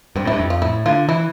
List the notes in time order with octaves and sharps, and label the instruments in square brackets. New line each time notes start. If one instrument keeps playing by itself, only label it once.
[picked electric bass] G2 [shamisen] C4
[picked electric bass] A2 [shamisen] E4
[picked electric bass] G2
F2
[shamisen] F4
[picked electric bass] A2 [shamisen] E4
[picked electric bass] D3 [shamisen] F4
[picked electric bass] E3 [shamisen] E4